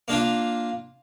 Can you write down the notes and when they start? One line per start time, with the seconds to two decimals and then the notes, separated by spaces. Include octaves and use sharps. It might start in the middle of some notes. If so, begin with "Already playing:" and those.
0.08 A#3 D4 F4